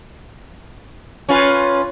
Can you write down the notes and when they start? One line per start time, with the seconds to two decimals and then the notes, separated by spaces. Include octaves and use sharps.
1.29 C#4 F4 B4